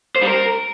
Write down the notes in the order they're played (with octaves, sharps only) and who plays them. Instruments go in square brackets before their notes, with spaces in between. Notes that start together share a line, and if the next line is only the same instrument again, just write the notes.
[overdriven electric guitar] C5
G3
A#4